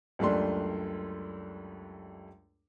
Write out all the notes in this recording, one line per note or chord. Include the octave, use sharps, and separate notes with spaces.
C#2 F#2 G3 A3 D4 C6